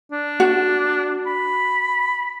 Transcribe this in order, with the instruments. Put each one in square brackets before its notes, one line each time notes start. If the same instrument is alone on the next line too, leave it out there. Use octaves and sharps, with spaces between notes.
[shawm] D4
[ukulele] F#4
[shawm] B5